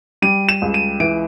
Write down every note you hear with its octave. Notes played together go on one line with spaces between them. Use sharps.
G3 D#7
E7
C#2
D#7
E3 D7